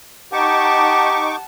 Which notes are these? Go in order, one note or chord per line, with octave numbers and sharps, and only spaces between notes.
D#4 G4 F#5 A5 C#6 D6